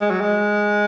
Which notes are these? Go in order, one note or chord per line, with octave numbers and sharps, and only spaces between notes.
G#3
F#3
G#3